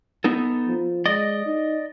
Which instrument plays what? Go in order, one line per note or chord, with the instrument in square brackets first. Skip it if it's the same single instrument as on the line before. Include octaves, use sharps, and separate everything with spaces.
[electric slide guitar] B3 D#4 A4
[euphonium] F3
[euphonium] G#3 [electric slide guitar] D5 D#5
[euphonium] D#4